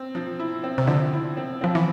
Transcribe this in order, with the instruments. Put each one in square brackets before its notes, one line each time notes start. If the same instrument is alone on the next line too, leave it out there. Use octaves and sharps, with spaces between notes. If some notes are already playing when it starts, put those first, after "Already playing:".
Already playing: [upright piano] C4
F3
E4
C4
[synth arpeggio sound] C3
[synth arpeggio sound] D3 [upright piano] F3
[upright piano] E4
C4
[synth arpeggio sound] F3 [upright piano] C4
[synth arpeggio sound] E3